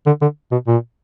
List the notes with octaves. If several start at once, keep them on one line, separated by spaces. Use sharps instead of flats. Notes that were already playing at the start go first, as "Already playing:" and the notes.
D3
D3
B2
A#2